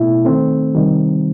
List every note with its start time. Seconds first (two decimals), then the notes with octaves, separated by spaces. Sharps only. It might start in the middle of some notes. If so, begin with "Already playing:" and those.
Already playing: B2 A3 E4
0.25 D#3 A3 C4
0.75 C3 D#3 G3